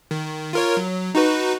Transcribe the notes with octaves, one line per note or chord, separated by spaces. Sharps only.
D#3
F4 A#4 C#5
F#3
D#4 F#4 B4